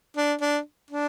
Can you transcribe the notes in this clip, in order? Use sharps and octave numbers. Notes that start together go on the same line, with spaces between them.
D4
D4
D4